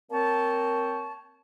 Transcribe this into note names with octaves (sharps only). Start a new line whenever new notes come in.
A#3 C4 C#5 A5